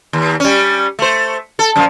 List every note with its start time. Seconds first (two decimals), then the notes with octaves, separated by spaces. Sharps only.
0.13 D#2
0.40 G3 C#4
0.99 A3 C5
1.59 A4
1.76 F#2 A#2 F3